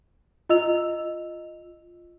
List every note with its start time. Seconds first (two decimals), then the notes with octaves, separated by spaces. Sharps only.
0.49 F4 D#5 E6 F7